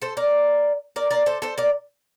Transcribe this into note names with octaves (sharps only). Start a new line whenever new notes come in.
A4 C5
A#4 D5
A#4 D5
A#4 D5
A4 C5
A4 C5
A#4 D5